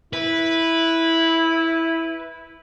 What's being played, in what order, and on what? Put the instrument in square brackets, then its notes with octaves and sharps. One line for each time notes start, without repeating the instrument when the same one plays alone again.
[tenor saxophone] E4 [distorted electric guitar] B4